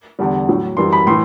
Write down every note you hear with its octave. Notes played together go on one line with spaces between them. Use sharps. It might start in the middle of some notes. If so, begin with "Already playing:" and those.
E2 D3 G3
A2 F#3
F#2 E3 G3 C6
B5
A2 E3 C6